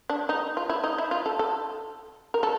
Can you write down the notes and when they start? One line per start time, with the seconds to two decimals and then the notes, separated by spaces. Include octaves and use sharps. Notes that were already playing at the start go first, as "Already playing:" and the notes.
0.10 D4
0.29 D#4
0.57 F4
0.69 E4
0.84 D#4
0.98 E4
1.11 F4
1.26 A4
1.39 A4
2.34 A#4
2.43 A4